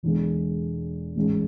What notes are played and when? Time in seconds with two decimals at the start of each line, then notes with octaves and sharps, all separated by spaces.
0.03 E1 E2 D3 G#3 D4
1.16 A1 G#2 G#3 C#4